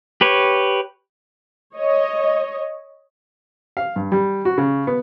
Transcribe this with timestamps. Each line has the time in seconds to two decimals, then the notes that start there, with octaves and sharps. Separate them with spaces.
0.21 G4 B4 C#5
1.75 C#5 D#5
3.77 F5
3.96 G2
4.12 G3
4.45 F#4
4.58 C#3
4.87 B3